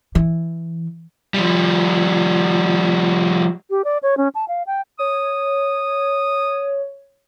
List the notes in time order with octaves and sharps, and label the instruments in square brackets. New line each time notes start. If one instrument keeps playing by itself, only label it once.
[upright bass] E3
[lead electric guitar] F3 G3
[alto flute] G4
D5
C#5
C#4
A5
F5
G5
[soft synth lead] C#5 [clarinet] D#6